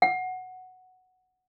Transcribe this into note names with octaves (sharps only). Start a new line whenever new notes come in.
F#5